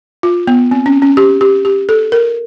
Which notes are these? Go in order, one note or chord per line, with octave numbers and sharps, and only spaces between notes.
F4
B3
C4
C#4
C#4
G4
G4
G4
A4
A#4